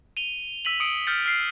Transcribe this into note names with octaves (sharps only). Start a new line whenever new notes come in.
D#7 F7 G7
E6 B6 D#7 F#7
D#6 C#7 D7
F6 G6 A6 C#7
F6 C7